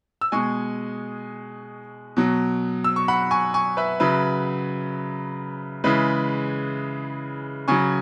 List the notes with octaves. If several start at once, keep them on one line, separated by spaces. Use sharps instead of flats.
E6
B2 G#3 G#5 C#6
B2 F#3
E6
C#6
F#5 B5
G#5 C#6
G#5 C#6
B4 E5
C#3 F#3 B4 E5
C#3 E3 G#3 B4 E5
C#3 F#3 G#5 C#6